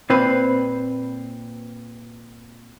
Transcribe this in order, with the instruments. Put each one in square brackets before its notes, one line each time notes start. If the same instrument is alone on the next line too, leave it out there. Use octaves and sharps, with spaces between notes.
[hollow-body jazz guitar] A#2 C4 B4 C5